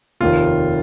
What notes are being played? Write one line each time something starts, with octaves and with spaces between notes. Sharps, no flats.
F1 D#2 D#3 F4